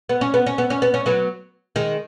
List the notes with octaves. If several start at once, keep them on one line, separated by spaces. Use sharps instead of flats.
B3
C#4
B3
C#4
B3
C#4
B3
C#4
F#3 B3
D#3 G#3